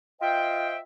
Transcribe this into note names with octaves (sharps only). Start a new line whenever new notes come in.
F4 C5 D#5 E5 G5